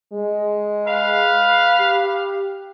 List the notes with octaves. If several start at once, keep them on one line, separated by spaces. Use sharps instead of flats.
G#3
B4 F5
G4